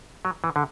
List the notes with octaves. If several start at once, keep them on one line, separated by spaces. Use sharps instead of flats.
F#3
E3
D3